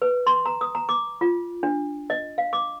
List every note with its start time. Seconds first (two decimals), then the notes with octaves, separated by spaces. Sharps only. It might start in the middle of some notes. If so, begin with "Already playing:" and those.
0.02 B4
0.27 C6
0.46 A#5
0.61 D#6
0.75 A#5
0.89 D6
1.21 F4
1.63 D4
2.10 D#5
2.38 F5
2.53 D6